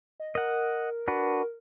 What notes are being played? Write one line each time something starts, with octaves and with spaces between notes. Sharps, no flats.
D#5
A#4 D#5 F#5
D4 F#4 B4